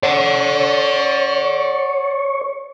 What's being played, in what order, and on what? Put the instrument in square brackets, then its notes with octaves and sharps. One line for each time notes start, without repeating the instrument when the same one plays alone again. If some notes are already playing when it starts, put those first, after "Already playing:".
[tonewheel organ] C#5 [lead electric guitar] D5 F#5